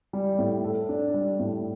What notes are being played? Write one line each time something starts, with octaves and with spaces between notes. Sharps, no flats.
G3
A2
A4
D4
G3
A2